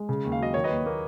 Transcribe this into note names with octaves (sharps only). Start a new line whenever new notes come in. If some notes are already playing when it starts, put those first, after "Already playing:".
Already playing: G#3
C#3
D#2
F5
F#3 D#5
D#3 C#5
B4 D#5
D#2
A#3